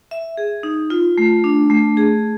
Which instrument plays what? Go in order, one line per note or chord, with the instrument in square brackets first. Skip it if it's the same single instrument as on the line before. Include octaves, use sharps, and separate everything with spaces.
[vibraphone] E5
G#4
D#4
F4
A3
D4
A3
G#4